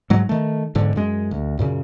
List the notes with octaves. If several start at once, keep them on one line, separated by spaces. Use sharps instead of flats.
G#2 F#3 G#3
D#3 A3
E1 G#2 D3
F#2 G#3
D2
F#2 A#2 C#3